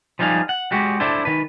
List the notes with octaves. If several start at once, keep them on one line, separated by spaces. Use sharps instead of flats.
F3 G3 D#4 G#4 F5
F#5
G#3 F#4 G4
D4 E4 A4 C5
D#3 B4